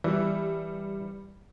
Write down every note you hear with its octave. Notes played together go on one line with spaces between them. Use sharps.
E3 G3